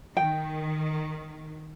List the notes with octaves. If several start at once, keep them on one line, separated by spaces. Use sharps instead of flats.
D#3 G5